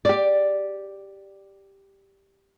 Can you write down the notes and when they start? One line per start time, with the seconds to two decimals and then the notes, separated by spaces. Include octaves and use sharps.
0.05 G4 D5